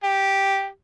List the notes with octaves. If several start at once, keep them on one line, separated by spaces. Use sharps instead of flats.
G4